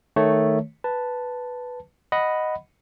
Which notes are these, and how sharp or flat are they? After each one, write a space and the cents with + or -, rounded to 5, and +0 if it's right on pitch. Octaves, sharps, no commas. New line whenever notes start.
D#3 +0 A3 +0 C#5 +0
B4 +0 A5 +0
D#5 +0 F#5 +0 B5 +0